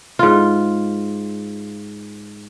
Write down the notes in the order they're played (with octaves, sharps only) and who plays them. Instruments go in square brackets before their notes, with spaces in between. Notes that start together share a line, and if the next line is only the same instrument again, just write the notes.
[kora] G#2 F4